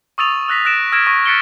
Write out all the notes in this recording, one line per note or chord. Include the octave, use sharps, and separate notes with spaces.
C#6 D#6 E6 A6 D#7 F7
E6 F#6 A#6 B6
E6 F#6 A#6 D7 E7 F7
E6 F6 G#6 A#6 D7 E7
C#6 A#6
F#6 A6 B6 C#7 D7 G7